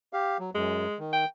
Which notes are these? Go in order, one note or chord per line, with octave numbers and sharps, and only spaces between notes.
G4 F5
F#3
F#2 G#3
D#3
G5